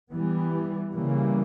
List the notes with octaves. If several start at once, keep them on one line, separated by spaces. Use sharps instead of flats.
E3 G3 B3
C#3 E3 G3 A#3